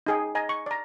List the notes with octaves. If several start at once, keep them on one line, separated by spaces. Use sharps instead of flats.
D#4 G#4 G5
D#5 G#5 A#5
C#6
D5 A#5